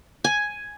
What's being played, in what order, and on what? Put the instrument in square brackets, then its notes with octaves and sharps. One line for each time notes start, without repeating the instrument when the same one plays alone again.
[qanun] G#5